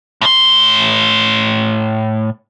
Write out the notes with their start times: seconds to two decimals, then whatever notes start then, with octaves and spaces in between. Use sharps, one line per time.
0.22 A2 C6